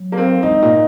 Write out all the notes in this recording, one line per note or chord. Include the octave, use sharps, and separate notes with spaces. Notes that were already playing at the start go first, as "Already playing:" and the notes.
Already playing: F#3
A#3
C4
G#2 D#4
A#2